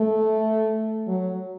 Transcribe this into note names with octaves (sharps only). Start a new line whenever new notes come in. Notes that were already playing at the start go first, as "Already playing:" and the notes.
Already playing: A3
F#3